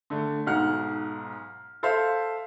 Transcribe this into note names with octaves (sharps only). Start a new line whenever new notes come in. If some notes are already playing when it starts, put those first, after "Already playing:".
D3 A3
B1 G#2 F#5 F6
A4 C5 E5 F5